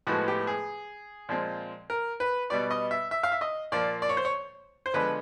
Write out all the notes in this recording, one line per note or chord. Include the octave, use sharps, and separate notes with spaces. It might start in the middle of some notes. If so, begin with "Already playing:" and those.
A2 F3 G#3 B3 F#4
G4
G#4
A#2 F3 G#3 C4
A#4
B4
B2 G3 B3 D5
D#5
E5
E5
F5
E5
D#5
A#2 F3 A#3 D5
D5
C#5
C5
C#5
C5
D3 F3 G#3 B3 B4